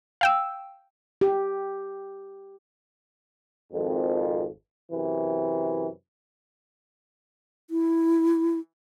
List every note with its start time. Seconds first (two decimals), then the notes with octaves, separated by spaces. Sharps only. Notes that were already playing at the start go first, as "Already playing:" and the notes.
0.21 F5 G5 E6
1.21 G4
3.73 G#1 F2
4.92 F#2 C3 E3
7.70 E4